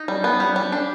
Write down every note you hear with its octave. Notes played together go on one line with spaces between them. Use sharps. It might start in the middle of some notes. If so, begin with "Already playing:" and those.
Already playing: D#4
G3
B3
G3
G3
D4